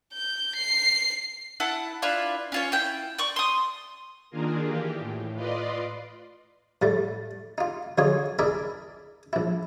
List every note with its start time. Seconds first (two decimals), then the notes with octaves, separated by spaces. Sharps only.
0.13 G6
0.56 C7
1.60 E4 F#5 A5
2.02 D4 E4 F4 B4
2.52 C#4 F4 C#5
2.72 E4 G5
3.19 D5 C#6
3.36 C6 D#6
4.30 D#3 A#3 D4 F4 G#4 A#4
4.64 E3 G4
4.99 A2
5.34 F4 B4 D5 D#5 C6
6.82 A2 G3 A3
7.58 D#4 F4
7.98 D3 F#3 D#4 F4 G#4 C#5
8.39 D4 E4 G#4 A#4 D#5 E5
9.33 A#1 E4